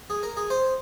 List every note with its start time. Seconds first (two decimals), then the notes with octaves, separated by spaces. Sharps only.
0.10 G#4
0.23 A#4
0.37 G#4
0.50 C5